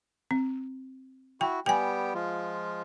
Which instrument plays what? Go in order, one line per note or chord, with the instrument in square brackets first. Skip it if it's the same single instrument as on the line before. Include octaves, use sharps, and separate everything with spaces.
[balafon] C4
[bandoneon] E4 F#4 [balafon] G5
[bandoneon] G3 B3 G4 [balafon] G5 G#5
[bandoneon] F3 G#3 F4